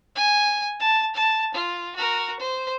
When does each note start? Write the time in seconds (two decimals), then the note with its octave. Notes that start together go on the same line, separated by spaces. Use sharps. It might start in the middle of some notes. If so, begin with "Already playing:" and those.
0.15 G#5
0.80 A5
1.14 A5
1.54 F4
1.96 F#4 A#4
2.39 C5